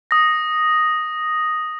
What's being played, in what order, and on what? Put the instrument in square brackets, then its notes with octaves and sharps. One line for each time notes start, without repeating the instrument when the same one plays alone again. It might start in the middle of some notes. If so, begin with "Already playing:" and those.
[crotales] D#6 A#6